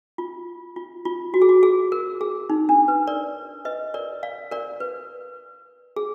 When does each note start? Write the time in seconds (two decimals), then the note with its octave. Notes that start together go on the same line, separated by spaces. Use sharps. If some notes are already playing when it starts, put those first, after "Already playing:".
0.18 F4
0.76 F4
1.05 F4
1.34 F#4
1.42 G#4
1.49 F#4
1.63 G#4
1.92 A#4
2.21 G#4
2.50 D#4
2.69 D4
2.88 B4
3.07 A#4 D5
3.65 B4 D#5
3.94 A#4 D5
4.23 D5 F5
4.51 A#4 D5
4.80 B4
5.96 G#4